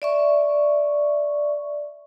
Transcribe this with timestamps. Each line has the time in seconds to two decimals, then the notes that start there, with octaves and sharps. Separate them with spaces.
0.02 D5 E5 C#6